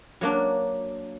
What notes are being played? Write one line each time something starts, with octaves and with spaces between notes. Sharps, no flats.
F#3 A#3 D4